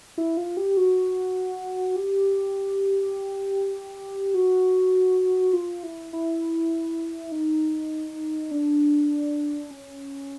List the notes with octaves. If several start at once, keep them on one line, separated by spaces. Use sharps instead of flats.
E4
F4
G4
F#4
G4
F#4
F4
E4
E4
D#4
D4
C#4